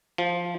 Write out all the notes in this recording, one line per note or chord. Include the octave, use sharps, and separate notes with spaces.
F3